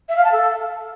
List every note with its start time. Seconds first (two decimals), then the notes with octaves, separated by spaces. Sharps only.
0.09 E5
0.16 F5
0.24 A5
0.32 A4